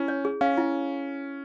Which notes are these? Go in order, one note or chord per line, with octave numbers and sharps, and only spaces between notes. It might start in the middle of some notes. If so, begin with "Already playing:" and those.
Already playing: C#4 E4
C#5
G#4
C#4 F5
E4